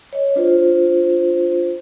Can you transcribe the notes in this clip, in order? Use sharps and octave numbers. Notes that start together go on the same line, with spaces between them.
C#5 D#5
D4 F4 C5